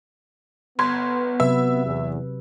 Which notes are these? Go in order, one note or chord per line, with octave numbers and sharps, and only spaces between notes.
G1 B3 C6 G#6
C3 F#3 B4 E5
E2